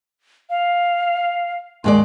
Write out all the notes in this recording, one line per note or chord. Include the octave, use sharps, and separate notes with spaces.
F5
D#2 G#3 D5 C6